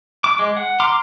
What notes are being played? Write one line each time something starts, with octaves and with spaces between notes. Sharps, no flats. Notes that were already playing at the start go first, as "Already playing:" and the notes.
D6
G#3
F#5
A#5 C6 D6 F6